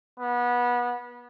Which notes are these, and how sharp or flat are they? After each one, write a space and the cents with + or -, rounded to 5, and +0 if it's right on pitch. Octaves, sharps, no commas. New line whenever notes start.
B3 -25